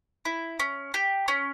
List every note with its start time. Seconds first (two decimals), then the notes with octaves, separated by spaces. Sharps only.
0.25 E4
0.59 C#4
0.94 G4
1.28 C#4